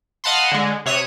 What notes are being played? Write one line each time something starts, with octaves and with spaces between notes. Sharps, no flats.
D#5 F5 F#5 A5 B5 C6
D3 G#3
C3 C#5 E5 D#6 F#6